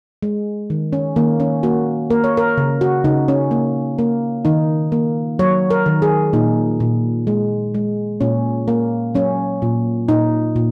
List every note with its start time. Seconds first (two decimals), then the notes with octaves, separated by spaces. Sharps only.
0.23 G#3
0.70 D#3
0.93 C#4
1.16 D#3 A#3
1.40 C#4
1.63 A#3 F#4
2.10 A#3 A#4
2.24 C#5
2.37 A#4
2.57 C#3
2.81 F#4
3.04 C#3 D#4
3.28 C#4
3.51 A#3
3.98 A#3
4.45 D#3 D#4
4.92 A#3
5.39 F#3 C#5
5.71 A#4
5.86 D#3
6.02 G#4
6.33 A#2 D#4
6.80 A#2
7.27 G#3
7.74 G#3
8.21 A#2 C#4
8.68 A#3
9.15 F#3 C#4
9.62 A#2
10.08 A#2 D#4
10.56 A#2